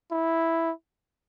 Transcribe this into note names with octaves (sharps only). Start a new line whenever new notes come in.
E4